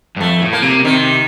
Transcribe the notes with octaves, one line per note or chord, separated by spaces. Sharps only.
G2
F2 A3
A2
A#3
C3
C3 D#3